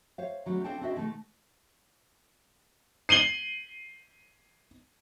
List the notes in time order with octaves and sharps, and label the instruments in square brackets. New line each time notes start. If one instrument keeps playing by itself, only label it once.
[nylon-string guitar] C5 C#5 F5
D#3 F#3 G3 A3 C#4
C4 D4 A4 F5 G5 A5
C4 D4 F#4 D#5 E5
B2 D#3 G#3 A3
[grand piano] C7 D#7 F#7 G7